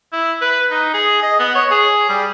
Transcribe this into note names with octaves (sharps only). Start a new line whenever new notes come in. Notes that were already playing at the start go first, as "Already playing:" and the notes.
E4
B4
D#4
G#4
D#5
B3
C#5
G#4
G3